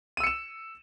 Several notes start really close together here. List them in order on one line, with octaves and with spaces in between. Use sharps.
D#7 E6 C#7 E7